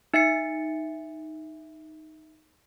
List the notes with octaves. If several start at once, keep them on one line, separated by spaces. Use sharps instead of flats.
D#4 E5 A6 C7 C#7